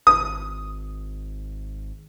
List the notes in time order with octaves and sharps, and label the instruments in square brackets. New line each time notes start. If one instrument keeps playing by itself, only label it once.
[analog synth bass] G#1 [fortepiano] D#6